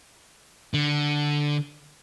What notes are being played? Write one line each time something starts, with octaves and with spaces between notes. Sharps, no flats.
D3